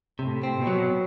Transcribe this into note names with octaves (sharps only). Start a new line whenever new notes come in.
A2 C3
C4
B2
F#3